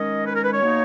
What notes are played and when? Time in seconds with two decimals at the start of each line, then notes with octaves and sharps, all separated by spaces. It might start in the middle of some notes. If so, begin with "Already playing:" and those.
Already playing: D#3 G#3 C#4 D#5
0.25 B4
0.34 A#4
0.43 B4
0.52 C#5
0.61 B2 A#3 D#4